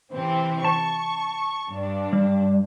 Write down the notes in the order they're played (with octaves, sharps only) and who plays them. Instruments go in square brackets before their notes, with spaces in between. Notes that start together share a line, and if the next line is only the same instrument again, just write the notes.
[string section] C3 E3 C4
[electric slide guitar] A5 [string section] C#6
[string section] G2 D4
[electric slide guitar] G3